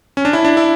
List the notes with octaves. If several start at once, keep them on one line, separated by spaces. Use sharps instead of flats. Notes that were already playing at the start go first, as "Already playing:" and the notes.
C#4
D4
E4
D4
E4